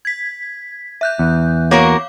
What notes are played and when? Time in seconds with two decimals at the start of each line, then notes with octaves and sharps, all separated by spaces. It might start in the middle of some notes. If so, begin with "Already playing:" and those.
0.05 G#6 B6
1.01 E5 F#6 G6
1.19 E2
1.71 A#3 F#4 A#4 C#5 F5 D6